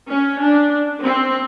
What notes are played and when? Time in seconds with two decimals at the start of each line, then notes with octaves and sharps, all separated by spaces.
0.10 C#4
0.40 D4
1.01 C4